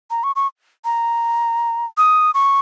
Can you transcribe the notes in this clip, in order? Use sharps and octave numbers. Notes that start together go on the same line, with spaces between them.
A#5
C#6
C#6
A#5
D#6
C#6